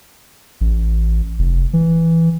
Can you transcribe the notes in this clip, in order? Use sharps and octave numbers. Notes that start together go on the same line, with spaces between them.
A1
F1
E3